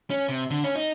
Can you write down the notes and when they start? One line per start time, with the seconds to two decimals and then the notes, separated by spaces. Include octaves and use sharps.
0.10 C#4
0.28 C3
0.50 D3
0.63 C#4
0.75 D#4